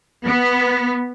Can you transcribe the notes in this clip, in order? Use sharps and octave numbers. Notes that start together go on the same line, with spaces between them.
B3